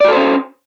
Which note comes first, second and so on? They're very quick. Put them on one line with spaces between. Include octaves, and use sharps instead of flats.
D5 F#4 A4 C5 C#4